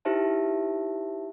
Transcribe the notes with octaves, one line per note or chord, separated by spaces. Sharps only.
D#4 E4 G4 C5 E5 A5